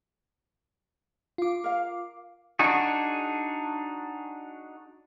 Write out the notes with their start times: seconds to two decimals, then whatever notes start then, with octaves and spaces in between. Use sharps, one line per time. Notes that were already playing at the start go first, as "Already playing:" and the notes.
1.38 F4 D6
1.64 A#4 F5
2.59 D4 D#4 F#4 G#4